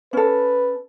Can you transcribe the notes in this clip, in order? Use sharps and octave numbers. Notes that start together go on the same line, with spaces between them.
C#4 A4 B4